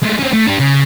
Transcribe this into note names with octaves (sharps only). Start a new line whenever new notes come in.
G#3 A3
C4 C#4
A3
D4 G4
C#3